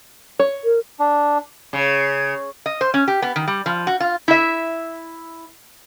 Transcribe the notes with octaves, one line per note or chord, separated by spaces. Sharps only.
C#5
A#4
D4
C#3
D#5
C5
C#4
G4
B3
D#3
G3
F3
F#4
F4
E4 E5